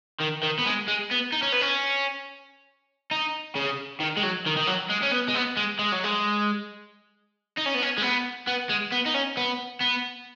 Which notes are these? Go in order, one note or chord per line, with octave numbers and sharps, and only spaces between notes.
D#3
D#3
B3
G#3
G#3
B3
D#4
C#4
B3
C#4
D#4
C#3
D#3
G#3
F#3
D#3
D#3
F#3
G#3
C#4
B3
G#3
B3
G#3
G#3
F#3
G#3
D#4
C#4
B3
C#4
G#3
B3
B3
G#3
B3
D#4
C#4
B3
B3